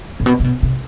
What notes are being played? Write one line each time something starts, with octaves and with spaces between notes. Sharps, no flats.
A2
B2
C3
B2
C3